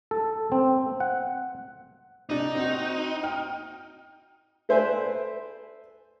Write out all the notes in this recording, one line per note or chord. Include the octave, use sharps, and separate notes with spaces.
A4
C4
F#5
C3 D4 D#4
C4 F#4
G5 F6
A4 B4 C5 D5 E5 G#5